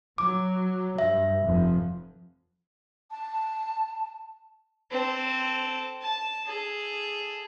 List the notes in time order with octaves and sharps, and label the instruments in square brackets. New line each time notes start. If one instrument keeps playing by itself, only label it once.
[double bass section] F#3 [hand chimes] D6
[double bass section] G2 [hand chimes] E5
[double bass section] F1 F2
[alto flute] A5
[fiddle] C4 A4
A5
G#4 A4